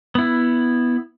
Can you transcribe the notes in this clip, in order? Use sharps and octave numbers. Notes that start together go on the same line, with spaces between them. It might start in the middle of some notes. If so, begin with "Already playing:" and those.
B3 E4